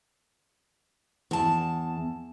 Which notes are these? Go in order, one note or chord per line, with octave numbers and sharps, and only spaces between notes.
E2 A5